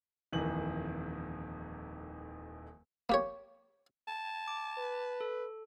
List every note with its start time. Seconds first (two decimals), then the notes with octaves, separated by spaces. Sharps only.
0.32 D#1 F2 D#3 E3 F#7
3.09 A#3 G4 C#5
4.08 A5
4.48 D6
4.78 B4
5.21 A4